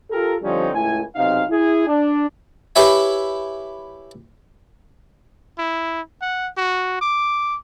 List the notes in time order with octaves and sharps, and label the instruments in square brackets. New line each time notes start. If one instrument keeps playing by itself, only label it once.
[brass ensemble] F4 G4 A4 A#4
D3 F3 G3 C4 C#4 D#4
C#2 A2 E4 G#5
B1 C3 D#4 F5
E4 G#4
D4
[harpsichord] E4 G4 B4 C#5 E5 G#5
[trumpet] E4
F#5
F#4
D6